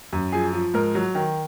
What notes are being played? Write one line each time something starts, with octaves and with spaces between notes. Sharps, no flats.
F#2
F3 G#4
F3
G#2 A#4
F#3
D#3